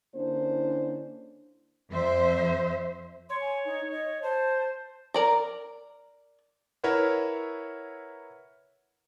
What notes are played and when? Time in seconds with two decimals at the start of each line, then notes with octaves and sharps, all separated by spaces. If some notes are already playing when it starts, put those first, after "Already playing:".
0.14 D3 A#3 C#4 D4 E4 C5
1.90 F2 C5 E5
3.29 C#5 C6
3.41 G#5
3.65 D#4
3.91 D#5
4.22 C5 A5
5.14 A#4 D5 A#5
6.84 E4 A#4 B4 C#5 E5 F#5